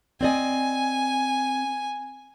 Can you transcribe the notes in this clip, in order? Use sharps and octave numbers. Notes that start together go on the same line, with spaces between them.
C4 D5 D#5 G#5